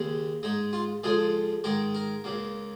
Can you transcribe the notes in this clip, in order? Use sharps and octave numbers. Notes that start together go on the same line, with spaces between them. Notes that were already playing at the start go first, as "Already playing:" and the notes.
Already playing: D#2 C#3 G#3
G#2 G#3 D#4
F4
F2 C#3 F3 G#3 G#4
G#2 D#3 G#3 A#4
A#4
C#2 C#3 A#3